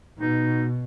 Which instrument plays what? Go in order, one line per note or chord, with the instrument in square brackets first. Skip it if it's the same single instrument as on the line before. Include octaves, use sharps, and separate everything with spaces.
[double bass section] B2 [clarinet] D#4